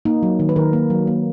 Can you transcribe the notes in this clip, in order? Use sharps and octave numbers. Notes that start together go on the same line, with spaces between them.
A#3 D#4
F#3
D#3
B4
D#3 A#4
A#3
F#3
A#3